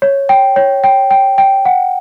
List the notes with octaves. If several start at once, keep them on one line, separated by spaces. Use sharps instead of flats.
C#5
G5
C#5
G5
G5
G5
F#5